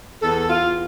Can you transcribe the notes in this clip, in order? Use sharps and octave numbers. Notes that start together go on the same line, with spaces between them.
E2 A4
E2 F4